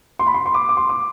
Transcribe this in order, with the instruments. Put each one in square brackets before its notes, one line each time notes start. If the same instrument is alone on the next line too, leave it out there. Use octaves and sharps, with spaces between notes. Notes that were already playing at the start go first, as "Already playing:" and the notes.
[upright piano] C6
B5
C6
C6
D6
D6
C6
D6